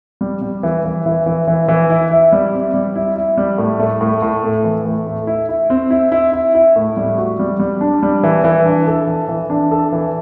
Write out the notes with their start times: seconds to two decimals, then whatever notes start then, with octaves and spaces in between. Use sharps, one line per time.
0.21 G3
0.42 G3
0.63 E3
0.85 E3
1.06 E3
1.26 E3
1.47 E3
1.68 E3
1.90 E4
2.11 E4
2.32 G3
2.53 C4
2.74 G3
2.96 E4
3.16 E4
3.37 G3
3.58 A2
3.79 A3
4.01 A2
4.22 A2
4.44 A3
4.64 E3
4.85 A2
5.07 A3
5.27 E4
5.49 E4
5.70 C4
5.91 E4
6.12 E4
6.33 E4
6.55 E4
6.76 A2
6.97 G3
7.18 F#4
7.39 G3
7.60 G3
7.81 D4
8.03 G3
8.23 E3
8.44 E3
8.65 D4
8.87 A4
9.07 E3
9.29 E3
9.50 D4
9.71 A4
9.92 E3